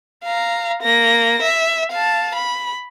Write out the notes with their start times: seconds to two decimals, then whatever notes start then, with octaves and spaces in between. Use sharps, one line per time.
0.24 F5 A#5
0.82 A#3 A#6
1.42 E5
1.92 F5 A5
2.35 B5